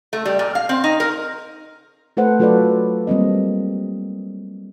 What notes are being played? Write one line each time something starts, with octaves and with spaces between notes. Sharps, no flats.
A3
G3
A#2
F5
C4
D#4
A#4
A3 A4 B4 C5 F#5
F#3 F4 A4 B4 C#5 D5
G3 A#3 C4 D#5